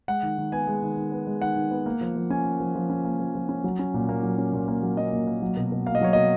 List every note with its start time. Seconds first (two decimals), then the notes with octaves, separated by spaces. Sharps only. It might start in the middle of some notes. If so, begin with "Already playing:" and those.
0.08 G#3 F#5
0.23 D#3
0.38 D#3
0.52 B3 G#5
0.67 G#3
0.82 D#3
0.97 D#3
1.12 B3
1.27 G#3
1.42 D#3 F#5
1.56 D#3
1.71 B3
1.86 A#3
2.01 F3
2.16 F3
2.30 C#4 G#5
2.45 A#3
2.60 F3
2.75 F3
2.90 C#4
3.05 A#3
3.20 F3
3.35 F3
3.49 C#4
3.64 F#3
3.79 C#4
3.94 A#2
4.09 A#3
4.23 F#3
4.38 C#4
4.53 A#2
4.68 A#3
4.83 F#3
4.97 C#4 D#5
5.13 A#2
5.27 A#3
5.42 F#3
5.57 B2
5.72 B2
5.86 A#3 F5
5.95 D#5
6.01 F#3 C#5
6.13 B2 D#5